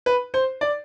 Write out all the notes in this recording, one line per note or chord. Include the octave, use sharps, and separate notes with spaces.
B4
C5
D5